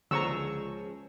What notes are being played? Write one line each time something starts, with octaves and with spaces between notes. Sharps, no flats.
C#2 D3 F3 C#4 G#4 A#5 C#6 E6